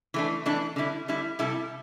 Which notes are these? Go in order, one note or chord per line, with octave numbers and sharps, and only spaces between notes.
E3 A3 D4
E3 A3 D4
D3 G3 E4
D3 G3 E4
C3 G3 E4 A4